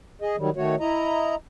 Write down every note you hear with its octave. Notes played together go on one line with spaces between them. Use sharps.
G#4 D#5
D#3 F#3 G3
D#3 A3 F#4 C#5
E4 D#5 A#5